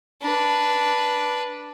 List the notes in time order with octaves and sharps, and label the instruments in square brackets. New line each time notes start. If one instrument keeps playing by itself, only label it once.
[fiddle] D4 B4